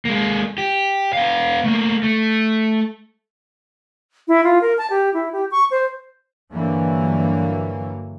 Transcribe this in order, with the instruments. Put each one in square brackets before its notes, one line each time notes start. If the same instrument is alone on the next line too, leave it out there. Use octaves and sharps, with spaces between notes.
[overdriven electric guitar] G#3 A#3
G4
B3 F5
A3 A#3
A3
[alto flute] E4
F4
A#4
A5
G4
E4
G4
C#6
C5
[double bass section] G2 D3 E3 F#3 A#3